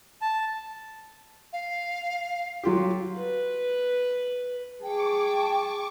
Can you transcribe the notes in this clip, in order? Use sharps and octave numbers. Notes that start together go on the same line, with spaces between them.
A5
F5
F#3 F4 G4
B4
G#4 G5 A5 C#6 D6